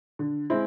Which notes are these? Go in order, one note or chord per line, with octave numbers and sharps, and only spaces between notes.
D3
G#3 C4 E4